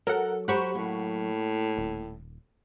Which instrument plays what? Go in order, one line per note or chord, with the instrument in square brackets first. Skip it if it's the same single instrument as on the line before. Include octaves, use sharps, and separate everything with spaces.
[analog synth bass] F#3 [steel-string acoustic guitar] A4 [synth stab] A#4 F#5
[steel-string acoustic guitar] G4 C5 A#5 [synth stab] F#5 B5 C#6
[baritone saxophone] A2 [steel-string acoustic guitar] A#3
[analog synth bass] D#1